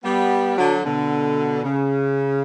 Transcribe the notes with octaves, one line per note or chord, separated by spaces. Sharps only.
G3 B3
D3 F#3
B2 D3
C#3